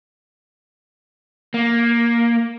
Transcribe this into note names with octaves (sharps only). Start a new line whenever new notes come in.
A#3